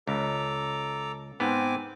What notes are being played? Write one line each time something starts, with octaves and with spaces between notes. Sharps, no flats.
C#2 A4 A#5 D6
G#2 B3 C4 G#5 D6